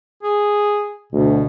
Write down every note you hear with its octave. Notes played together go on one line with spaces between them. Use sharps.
G#4
D2 B2